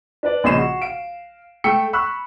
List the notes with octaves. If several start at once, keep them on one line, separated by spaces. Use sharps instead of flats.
D4 B4 D5
A#1 C#3 C#4 D#5 C7 E7
F#4
F5 D7
A3 G5 E6 C#7
B5 C#6 E6 F#6